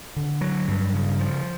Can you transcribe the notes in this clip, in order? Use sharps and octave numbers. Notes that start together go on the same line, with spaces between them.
D3
F#3
G2
C#3
F3